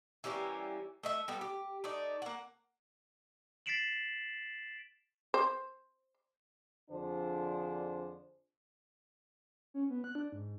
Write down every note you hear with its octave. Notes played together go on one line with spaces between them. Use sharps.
E3 G3 A#3 C#4
A3 D#5 E5
G3 B3 A4
G4
A3 D#4 D5
A#3 F#5
A6 B6 C7 D7 E7 F#7
C5
F2 D3 F3 D4 G#4 C5
C#4
B3
F#6
D4
G#2